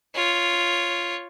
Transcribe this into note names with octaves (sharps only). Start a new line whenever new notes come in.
F4 C#5